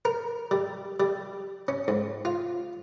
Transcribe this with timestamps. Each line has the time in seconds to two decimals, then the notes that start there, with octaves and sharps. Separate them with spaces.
0.05 A#4
0.51 G3
1.00 G3
1.68 C#4
1.88 G#2
2.25 F4